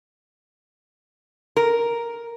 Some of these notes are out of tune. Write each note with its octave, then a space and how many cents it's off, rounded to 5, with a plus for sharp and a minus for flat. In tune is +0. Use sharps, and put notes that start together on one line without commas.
A#4 +5